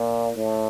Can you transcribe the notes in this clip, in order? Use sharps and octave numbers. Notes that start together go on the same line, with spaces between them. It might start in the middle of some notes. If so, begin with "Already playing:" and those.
Already playing: A#2
A2